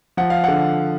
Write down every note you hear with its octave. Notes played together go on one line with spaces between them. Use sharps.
F3 F#5
F5
D3 F#5